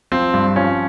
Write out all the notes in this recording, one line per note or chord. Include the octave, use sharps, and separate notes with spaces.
F3 C4
G2
F3 C#4